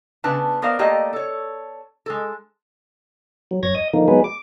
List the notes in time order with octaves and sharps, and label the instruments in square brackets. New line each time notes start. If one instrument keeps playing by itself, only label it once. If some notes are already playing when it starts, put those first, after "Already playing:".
[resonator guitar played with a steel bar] C#3 B3 D4 B4 A5
B3 A#4 C5 D5 F5
A3 A#3 G4 D5 D#5 G5
A4 C#5
G#3 A4
[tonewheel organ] F#3
F#2 C#5 G#6 A#6
D#5 D#6
D3 D#3 F3 A#3 D#4
F#3 G#3 B3 D#4 G#4 B4
D6